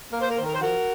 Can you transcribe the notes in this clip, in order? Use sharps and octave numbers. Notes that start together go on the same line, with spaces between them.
A#3 A#4
C5
A#4
D#3 C5
A#4
C5
F3 F#4 A#4